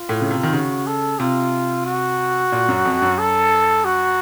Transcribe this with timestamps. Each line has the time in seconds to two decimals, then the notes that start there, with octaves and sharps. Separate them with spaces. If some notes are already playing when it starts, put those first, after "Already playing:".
Already playing: F4
0.09 A2
0.21 C#3
0.31 C3
0.43 D#3
0.53 C#3 F#4
0.87 A4
1.20 C3 F4
1.86 F#4
2.52 A#2
2.68 F#2
2.85 F2
3.02 F#2
3.19 A4
3.85 F#4